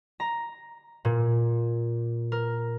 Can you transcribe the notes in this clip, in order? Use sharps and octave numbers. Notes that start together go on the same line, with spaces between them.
A#5
A#2
A#4